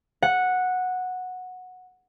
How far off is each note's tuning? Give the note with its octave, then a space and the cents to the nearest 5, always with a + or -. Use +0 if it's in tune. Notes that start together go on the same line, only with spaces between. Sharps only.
F#5 -10